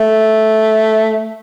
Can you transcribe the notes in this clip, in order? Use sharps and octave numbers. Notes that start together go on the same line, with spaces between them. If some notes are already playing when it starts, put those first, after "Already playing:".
Already playing: A3